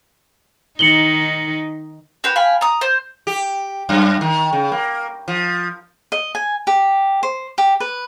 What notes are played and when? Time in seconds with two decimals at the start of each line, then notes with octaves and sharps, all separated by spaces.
0.79 D#3 D#4 C#7 F#7 G7
2.24 F#4 G4 B4
2.36 F5 G5 G#5 B5
2.61 A#5 D#6
2.81 C5
3.27 G4
3.89 F#2
4.21 D#3
4.53 C#3
4.72 A#3
5.28 F3
6.12 D#5
6.35 G#5
6.67 G4
7.23 C5
7.58 G4
7.80 B4